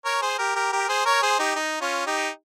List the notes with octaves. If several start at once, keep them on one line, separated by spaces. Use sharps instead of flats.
A#4 C#5
G#4 C5
G4 A#4
G4 A#4
G4 A#4
G#4 C5
A#4 C#5
G#4 C5
D#4 G4
D#4
C#4 F4
D#4 G4